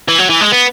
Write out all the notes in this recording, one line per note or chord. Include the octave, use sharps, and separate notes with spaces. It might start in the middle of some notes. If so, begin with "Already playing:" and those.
E3
F#3
E3
G#3
B3